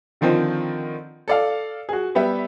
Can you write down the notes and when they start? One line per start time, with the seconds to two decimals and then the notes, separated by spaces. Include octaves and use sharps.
0.21 D3 D#3 F3 C4
1.28 A4 D5 F5
1.89 F#4 G#4
2.15 G3 B3 G4 E5